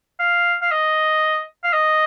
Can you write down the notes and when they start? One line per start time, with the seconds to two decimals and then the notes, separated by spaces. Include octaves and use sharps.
0.20 F5
0.62 F5
0.71 D#5
1.64 F5
1.73 D#5